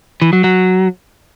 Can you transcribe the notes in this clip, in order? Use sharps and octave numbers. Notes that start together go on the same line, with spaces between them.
E3
F#3
F#3